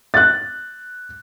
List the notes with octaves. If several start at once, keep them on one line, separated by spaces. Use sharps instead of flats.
F#6 A6